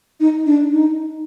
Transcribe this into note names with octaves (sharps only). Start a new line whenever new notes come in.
D#4
D4
D#4